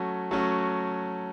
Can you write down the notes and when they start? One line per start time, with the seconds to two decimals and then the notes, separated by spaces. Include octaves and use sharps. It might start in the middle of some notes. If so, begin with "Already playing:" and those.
Already playing: F#3 A3 C#4 F#4
0.31 F#3 A3 C#4 F#4